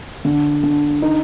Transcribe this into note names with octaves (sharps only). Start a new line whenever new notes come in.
D3
D3
D#4